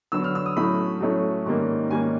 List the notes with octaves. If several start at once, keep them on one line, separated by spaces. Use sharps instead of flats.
D3 F#3 B3 E6
F6
E6
D#6
A2 F#3 A3 C#4 B5
A2 F#3 A3 C#4
G#2 D#3 G3 A#3 C#4
G#2 D#3 G3 A#3 C#4 G#5